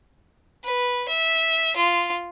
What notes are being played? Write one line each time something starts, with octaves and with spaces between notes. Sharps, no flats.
B4
E5
F4